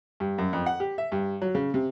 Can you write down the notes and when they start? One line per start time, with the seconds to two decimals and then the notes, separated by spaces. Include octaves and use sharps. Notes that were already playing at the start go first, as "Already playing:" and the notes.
0.20 G2
0.38 F#2
0.53 F2
0.66 F#5
0.80 G4
0.98 E5
1.12 G2
1.42 F#3
1.55 C#3
1.74 C3